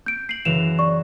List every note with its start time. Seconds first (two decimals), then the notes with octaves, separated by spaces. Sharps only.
0.06 G6 D7
0.29 C7 D#7 F#7
0.45 F#2 C#3 E3 E7 F7
0.79 D5 C#6